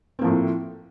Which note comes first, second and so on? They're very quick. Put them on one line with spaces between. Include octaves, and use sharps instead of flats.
C4 A#3 F3 A2